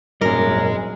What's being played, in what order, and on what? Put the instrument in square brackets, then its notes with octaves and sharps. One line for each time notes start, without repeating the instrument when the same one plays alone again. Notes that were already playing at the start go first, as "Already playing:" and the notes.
[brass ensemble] G#1 F#2 [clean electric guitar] A#2 G3 [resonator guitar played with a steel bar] A#4 [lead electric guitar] D#5 G#5